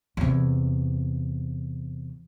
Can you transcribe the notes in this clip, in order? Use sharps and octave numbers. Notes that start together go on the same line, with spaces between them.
E2 C3